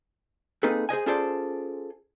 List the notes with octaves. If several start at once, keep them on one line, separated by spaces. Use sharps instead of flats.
A#3 C4 D#4 G#4 A4 B4
G#4 C5 D#5 G#5
C#4 F4 G#4 A4 C5 D5